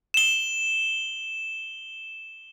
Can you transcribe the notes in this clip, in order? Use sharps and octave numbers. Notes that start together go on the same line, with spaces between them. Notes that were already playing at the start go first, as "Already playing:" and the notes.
E7 G7